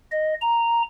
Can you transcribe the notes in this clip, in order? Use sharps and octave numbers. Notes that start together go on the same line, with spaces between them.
D#5
A#5